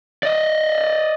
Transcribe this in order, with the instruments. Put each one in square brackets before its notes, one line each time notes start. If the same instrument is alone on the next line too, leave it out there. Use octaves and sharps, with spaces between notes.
[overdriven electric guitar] D5 D#5